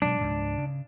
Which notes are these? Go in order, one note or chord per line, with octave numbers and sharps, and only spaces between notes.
B2 F#3 G#3 D4
C#2 G#2
C#3